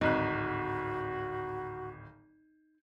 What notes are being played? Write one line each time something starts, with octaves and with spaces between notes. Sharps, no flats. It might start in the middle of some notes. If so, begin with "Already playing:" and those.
D1 G#1 D#4 F#4 F#6